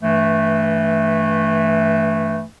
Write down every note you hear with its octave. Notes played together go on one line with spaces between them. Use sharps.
G2 E3 A3